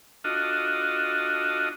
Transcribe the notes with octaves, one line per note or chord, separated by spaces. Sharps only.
D4 F4 F#4 A4 D#5